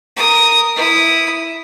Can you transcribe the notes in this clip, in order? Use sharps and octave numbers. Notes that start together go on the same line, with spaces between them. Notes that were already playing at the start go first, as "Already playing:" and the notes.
A#4 D#6
E4 D#6